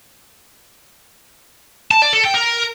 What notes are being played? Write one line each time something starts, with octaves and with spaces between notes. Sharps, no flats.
A5
D5
A4
G5
A#4